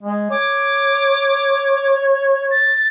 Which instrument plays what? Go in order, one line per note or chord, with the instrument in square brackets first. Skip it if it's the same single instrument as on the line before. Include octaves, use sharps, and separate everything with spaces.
[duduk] G#3
[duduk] C#5 [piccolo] D6
[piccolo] A6